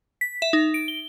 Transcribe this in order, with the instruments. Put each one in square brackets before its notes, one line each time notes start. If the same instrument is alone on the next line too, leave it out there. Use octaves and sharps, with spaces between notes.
[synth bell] B6
E5
D#4
D7
G7